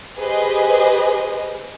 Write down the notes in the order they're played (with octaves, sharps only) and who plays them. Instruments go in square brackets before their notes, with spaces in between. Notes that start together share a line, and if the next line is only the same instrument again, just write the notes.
[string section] G4 G#4 B4 C5 D#5